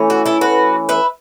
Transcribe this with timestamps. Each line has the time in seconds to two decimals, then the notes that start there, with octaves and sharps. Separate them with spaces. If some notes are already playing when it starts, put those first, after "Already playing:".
Already playing: E3 A3 C#4
0.10 F#4
0.26 E4 A4
0.41 F#4 B4
0.89 B4 E5